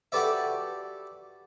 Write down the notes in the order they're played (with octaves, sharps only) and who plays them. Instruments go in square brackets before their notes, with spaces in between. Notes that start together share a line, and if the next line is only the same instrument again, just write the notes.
[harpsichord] F#4 G4 A4 B4 D5 E5